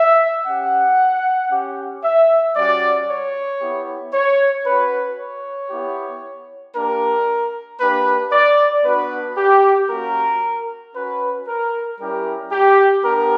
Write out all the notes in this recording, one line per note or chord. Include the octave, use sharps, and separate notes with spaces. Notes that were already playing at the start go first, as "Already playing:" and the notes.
Already playing: E5
C#4 G4 F#5
C#4 G4
E5
G3 C#4 F#4 D5
C#5
B3 E4 G4
C#5
C#4 F#4 B4
C#5
B3 E4 G4
A#3 D4 G4 A#4
A#3 D4 G4 B4
D5
B3 D4 F#4 B4
G4
A#3 C#4 F#4 A#4
C#4 F#4 B4
A#4
G3 C#4 E4 G4 A#4
G4
B3 D4 G4 A#4